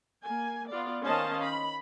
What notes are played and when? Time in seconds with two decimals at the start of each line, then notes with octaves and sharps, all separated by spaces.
0.23 A#3 G#5
0.69 B3 F4 D5
1.03 D#3 C#4 C5 D#5 F5 A5
1.42 B5